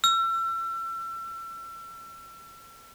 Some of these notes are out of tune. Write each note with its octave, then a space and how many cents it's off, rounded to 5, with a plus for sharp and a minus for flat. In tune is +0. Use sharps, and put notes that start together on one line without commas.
E6 +35